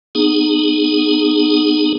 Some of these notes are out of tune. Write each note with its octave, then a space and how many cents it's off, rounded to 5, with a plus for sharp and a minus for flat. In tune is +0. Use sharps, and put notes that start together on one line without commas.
B3 +0 D#4 -30 G#4 +0